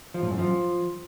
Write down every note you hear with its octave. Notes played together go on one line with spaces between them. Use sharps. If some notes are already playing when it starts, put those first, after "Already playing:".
F3
A2
F#2
F3